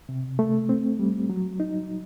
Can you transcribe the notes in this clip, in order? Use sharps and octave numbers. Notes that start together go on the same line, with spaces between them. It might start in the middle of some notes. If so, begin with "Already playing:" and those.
C3
A3
C4
G3
F#3
D#4